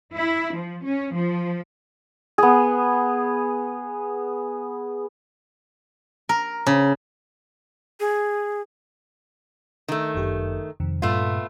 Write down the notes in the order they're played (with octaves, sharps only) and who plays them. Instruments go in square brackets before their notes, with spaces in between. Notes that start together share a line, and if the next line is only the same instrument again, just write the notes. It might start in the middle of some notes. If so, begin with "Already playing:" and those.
[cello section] E4
F3
C#4
F3
[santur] B3 G#4
[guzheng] A#4
C#3
[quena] G#4
[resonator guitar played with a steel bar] D#3 A3
[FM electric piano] G1 F#2 G4
F2 C3 D#3
[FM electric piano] G2 A#2 [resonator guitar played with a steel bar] A3 B3 F4